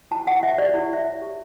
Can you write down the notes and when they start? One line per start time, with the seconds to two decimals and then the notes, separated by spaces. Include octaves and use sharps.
0.11 E4 A5
0.27 E4 F#5
0.42 C#5 E5
0.58 G4 D5
0.74 E4
0.89 E4 E5
1.05 C#5
1.22 G4